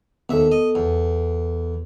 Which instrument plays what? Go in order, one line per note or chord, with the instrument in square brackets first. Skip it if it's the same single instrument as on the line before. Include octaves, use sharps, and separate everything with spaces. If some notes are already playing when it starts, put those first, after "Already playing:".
[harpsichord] D#2 E5 [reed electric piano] B3 A4
[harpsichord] D#5
E2